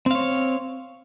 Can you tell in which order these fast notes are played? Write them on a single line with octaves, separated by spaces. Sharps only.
C4 F5 C#5